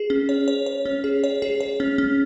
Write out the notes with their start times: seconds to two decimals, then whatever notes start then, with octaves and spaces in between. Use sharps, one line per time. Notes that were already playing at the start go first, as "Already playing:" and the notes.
Already playing: G#4
0.10 C#4
0.29 C#5
0.48 C#5
0.66 C#5
0.86 C#4
1.04 G#4
1.24 C#5
1.42 G#4
1.60 C#5
1.80 C#4
1.98 C#4